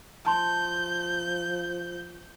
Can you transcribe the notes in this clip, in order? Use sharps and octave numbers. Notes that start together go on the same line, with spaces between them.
F3 A5 C6 G6